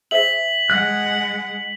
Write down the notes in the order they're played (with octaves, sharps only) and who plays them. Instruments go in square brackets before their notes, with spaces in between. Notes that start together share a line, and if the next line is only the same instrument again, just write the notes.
[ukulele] G#4 C5 E5 [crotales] B6 F#7
[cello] G#3 F#5 [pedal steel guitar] F#6